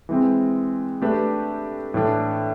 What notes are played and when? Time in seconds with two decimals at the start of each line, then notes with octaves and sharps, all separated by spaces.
0.09 E3 G#3 C4
1.02 A3 D4 G4 B4
1.94 A2 E3 A3 D4